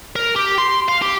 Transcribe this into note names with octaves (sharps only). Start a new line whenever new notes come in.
A#4
G4
C6
F5
G4